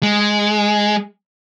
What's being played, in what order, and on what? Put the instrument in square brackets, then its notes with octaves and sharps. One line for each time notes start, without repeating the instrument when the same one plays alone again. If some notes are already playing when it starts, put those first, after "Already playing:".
[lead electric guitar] G#3